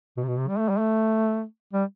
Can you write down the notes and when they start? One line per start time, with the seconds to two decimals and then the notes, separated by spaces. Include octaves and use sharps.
0.17 B2
0.23 C3
0.28 B2
0.38 C3
0.49 G3
0.59 A3
0.69 G3
0.79 A3
1.73 G3